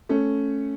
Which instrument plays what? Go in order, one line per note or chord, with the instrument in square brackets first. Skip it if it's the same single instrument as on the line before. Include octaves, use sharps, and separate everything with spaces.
[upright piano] A3 C#4